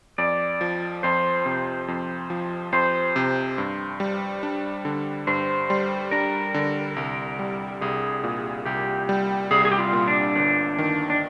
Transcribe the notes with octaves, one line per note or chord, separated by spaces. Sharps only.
F2 D5
F3
F2 C5
C3
F2
F3
F2 C5
C3
G2
G3
D4
D3
G2 C5
G3
D4 A#4
D3
C2
G3
C2 G#4
A#2
C2 G4
G3
C2 G#4
G#4
G4
F4
A#2
D4
G1
D#3
D4